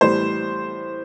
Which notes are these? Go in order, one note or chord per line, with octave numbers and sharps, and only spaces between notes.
A2 E3 G3 C5